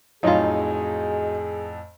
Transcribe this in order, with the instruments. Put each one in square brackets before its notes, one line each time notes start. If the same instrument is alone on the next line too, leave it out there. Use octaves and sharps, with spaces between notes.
[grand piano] F2 A2 G#5 [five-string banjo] F#3 F4 [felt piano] D#4 [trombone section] G#4